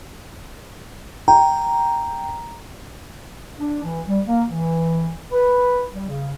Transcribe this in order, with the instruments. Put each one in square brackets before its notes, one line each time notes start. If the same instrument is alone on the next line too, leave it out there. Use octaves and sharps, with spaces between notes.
[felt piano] G5 [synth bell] A#5
[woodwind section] D4
E3
G3
A#3
E3
B4
G3
C#3